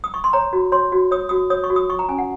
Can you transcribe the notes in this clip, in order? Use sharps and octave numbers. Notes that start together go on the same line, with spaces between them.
D#6
C#6
C6
C#5 A#5
F#4
C#5 C6
F#4
C#5 D#6
F#4 D#6
C#5 D#6
C#6
F#4
D#6
F4 C#6
A#5
C#4 G#5
F#5